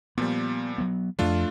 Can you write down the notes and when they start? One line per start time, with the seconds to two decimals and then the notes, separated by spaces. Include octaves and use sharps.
0.18 A#2 F3 G3 B3
0.78 F#3 B3
1.19 F2 F3 A3 D4 F4